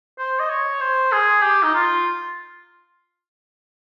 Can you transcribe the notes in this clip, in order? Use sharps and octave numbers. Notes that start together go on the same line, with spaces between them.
C5
D#5
C#5
C5
G#4
G4
D#4
F4